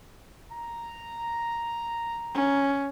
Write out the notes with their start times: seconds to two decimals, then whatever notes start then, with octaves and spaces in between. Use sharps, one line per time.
0.52 A#5
2.34 C#4